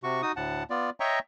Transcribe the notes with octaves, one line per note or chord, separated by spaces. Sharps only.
C3 F#4 C#6
D#4 F#4 D#6
D2 A2 F#5 A5
B3 F4 D5
C#5 D#5 E5 G5 A#5 C#6